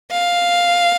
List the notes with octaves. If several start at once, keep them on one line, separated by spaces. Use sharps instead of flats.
F5